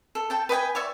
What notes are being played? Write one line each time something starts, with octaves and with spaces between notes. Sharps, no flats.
A4
A4 G5 A5
B4 D#5 G5 G#5
C#5 D5 E5 C#6